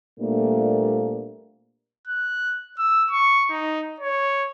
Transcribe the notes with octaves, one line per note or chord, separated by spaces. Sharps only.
A#2 G3 A3 A#3 C4 D4
F#6
E6
C#6
D#4
C#5